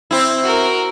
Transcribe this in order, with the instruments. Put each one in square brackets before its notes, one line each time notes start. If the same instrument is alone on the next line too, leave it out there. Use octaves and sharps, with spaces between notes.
[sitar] C4 E4
[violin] F#4 A#4